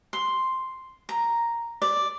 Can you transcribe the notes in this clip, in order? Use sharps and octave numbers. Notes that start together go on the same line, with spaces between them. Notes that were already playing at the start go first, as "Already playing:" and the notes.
C6
A#5
D5